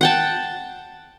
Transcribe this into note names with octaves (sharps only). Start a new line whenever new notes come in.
F#5 G5 A5